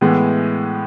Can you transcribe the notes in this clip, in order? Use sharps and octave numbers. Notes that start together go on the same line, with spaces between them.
A2 E3 G#3 B3